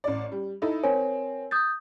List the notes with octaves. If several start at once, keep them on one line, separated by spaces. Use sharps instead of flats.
A1 D5
G3
D#4 E4 A4
C4 A#4 C#5 G#5
D#6 G6 A6